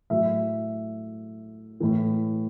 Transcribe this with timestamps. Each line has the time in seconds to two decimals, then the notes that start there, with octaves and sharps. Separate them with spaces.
0.10 A2 F#3 E5
1.80 A2 E3